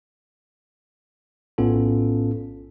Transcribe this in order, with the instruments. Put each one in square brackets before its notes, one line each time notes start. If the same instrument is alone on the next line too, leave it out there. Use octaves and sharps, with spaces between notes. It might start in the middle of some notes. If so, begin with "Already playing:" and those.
[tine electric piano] A#1 A2 B3 C#4 F4 A4